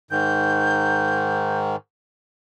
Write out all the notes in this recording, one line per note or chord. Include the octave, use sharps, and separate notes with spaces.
G#2 D#3 G6